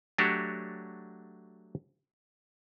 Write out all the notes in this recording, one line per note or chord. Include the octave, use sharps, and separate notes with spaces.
F#3 A3 D4 F#4 G4 C#5